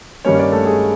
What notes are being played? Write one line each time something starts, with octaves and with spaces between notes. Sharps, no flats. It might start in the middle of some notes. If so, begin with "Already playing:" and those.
G2 D#3 G3 A#3 C#4 C#5
D4 D5
A3 A4
G#3 G#4